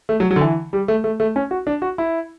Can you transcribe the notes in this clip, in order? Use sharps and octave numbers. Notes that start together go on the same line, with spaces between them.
A3
F#3
F#3
D3
E3
G3
A3
A3
A3
C#4
F#4
D4
F#4
E4